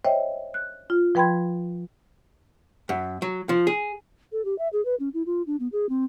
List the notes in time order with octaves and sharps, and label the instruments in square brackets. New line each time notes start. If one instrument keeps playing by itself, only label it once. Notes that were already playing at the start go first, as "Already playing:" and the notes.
[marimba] C5 C#5 D#5 E5 G5
F#6
F4
F3 B4 G5 B5 C6 G#6
[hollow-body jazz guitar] F#2
F#3
F3
G#4
[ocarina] A4
G4
E5
G#4
B4
C#4
E4
F4
D4
B3
G#4
C4